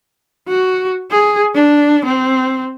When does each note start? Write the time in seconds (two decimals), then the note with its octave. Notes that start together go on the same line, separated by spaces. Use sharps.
0.48 F#4
1.11 G#4
1.54 D4
2.05 C4